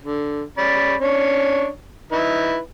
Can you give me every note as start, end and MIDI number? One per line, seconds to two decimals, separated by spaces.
0.03 0.44 50
0.58 0.95 61
0.58 0.95 74
0.58 0.95 83
1.01 1.68 61
1.01 1.68 62
1.01 1.68 73
2.12 2.58 63
2.12 2.58 64
2.12 2.58 71